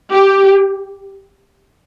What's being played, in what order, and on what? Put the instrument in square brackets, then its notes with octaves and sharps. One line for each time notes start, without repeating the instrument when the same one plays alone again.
[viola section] G4